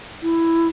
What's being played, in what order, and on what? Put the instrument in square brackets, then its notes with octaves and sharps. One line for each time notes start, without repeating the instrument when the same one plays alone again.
[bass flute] E4